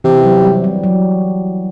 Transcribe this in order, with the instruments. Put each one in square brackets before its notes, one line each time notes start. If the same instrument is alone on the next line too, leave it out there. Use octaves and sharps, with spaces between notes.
[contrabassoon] C3 [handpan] E3
[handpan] F#3
G3
G3
F#3